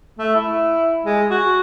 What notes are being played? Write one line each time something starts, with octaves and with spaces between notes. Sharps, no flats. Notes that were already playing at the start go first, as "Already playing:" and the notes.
A3
E4
G#3
F#4